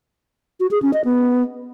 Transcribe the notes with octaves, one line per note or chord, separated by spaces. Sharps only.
F#4
G#4
C#4
D#5
B3